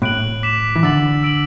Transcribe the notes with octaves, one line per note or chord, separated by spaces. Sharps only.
A2 F#6 D7 F#7
D6 B6 E7
E3
D3 E6 A6 F#7
E6 D7 F#7